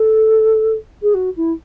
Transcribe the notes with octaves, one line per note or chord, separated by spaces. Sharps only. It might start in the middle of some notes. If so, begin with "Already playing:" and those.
Already playing: A4
G#4
F#4
E4